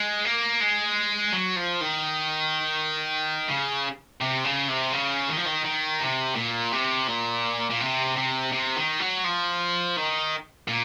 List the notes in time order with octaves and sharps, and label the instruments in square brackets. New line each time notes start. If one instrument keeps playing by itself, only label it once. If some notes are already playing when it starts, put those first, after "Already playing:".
Already playing: [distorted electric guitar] G#3
A#3
G#3
F#3
F3
D#3
C#3
C3
C#3
C3
C#3
D#3
F3
D#3
D#3
C3
A#2
C3
A#2
A#2
C3
C3
C3
D#3
F#3
F3
D#3
A#2